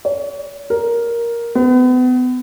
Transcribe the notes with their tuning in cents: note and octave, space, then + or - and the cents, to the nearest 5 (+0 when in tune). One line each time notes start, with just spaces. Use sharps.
C#5 +35
A#4 +5
B3 +35